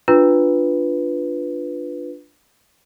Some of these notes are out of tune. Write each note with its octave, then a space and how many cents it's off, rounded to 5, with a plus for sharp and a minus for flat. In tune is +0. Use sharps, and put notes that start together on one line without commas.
D4 +0 F4 +0 B4 +0